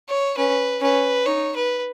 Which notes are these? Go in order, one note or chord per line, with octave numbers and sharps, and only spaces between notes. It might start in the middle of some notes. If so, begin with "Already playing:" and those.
C#5
C#4 B4
C#4 B4
D#4 C#5
B4